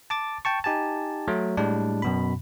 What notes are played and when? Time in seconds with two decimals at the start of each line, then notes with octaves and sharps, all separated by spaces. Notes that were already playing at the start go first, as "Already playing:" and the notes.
0.10 A5 D6 A6
0.45 G5 A5 C#6
0.64 D#4 G4 G#5 A5
1.28 F#3 A3
1.57 A2 G3 G#3 D4
2.02 F#2 B2 B5